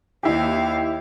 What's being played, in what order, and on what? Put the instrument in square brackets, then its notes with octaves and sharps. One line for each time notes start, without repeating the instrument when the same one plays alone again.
[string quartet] D#2 F5 [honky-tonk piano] D#4 E4 G4